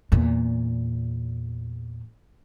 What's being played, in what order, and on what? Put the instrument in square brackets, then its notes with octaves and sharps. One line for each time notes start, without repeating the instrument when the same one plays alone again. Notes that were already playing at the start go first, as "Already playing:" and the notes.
[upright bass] E2 A#2